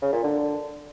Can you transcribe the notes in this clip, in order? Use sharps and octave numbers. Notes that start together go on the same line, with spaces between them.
C#3
A#2
D3